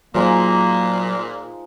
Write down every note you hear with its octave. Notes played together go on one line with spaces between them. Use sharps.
A#2 F3 F#3 G#3 A#3 D#4